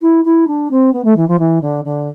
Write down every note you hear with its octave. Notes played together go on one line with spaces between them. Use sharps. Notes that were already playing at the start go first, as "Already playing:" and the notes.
E4
E4
D4
C4
B3
A3
E3
F3
E3
D3
D3